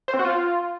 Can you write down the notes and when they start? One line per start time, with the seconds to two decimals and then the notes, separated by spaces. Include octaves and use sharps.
0.08 C5
0.14 C4
0.19 F#4
0.25 F4